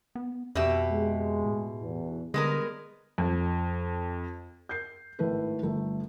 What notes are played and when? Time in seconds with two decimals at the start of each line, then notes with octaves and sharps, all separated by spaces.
0.15 B3
0.55 F2 B2 G4 E5
0.91 G#3
1.46 A2
1.81 E2
2.34 D3 G3 G#3 B3 A#4
3.18 F2
4.69 G6 C7
5.19 G#1 A2 A3 B4
5.63 G1 A3